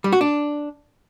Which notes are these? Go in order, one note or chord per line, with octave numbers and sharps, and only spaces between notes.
G3
F#4
D4